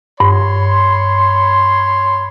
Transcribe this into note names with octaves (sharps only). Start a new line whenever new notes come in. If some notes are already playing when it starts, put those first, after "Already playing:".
G2 C#5 B5 C6